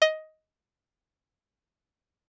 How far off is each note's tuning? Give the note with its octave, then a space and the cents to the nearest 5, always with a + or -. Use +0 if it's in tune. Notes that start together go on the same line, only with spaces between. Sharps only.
D#5 +10